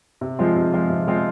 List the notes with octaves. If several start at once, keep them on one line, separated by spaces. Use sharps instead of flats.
C3
F3 G#3 C4 F4
C3
F3 G#3 C4 F4
C3
F3 G#3 C4 F4